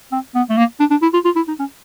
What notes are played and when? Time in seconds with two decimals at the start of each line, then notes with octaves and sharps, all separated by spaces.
0.12 C4
0.35 B3
0.50 A3
0.57 A#3
0.80 D4
0.91 D4
1.02 E4
1.14 F4
1.25 F4
1.36 E4
1.48 D#4
1.59 C#4